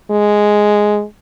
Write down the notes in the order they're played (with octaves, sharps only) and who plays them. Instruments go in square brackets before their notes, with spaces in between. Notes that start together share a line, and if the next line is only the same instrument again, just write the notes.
[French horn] G#3